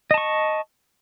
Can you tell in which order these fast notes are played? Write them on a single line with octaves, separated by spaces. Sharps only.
D#5 A5 C#6